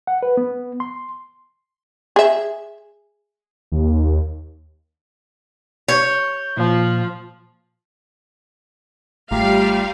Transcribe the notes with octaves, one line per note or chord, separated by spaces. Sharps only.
F#5
B4
B3
C6
G#4 E5
D#2
C#5 G6
A#2 F3
G#1 G3 A3 F4 G4 F5 A#5